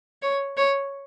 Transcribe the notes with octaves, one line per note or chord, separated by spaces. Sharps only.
C#5
C#5